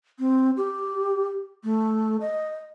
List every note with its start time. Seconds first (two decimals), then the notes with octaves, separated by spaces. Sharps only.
0.19 C4
0.57 G4
1.64 A3
2.21 D#5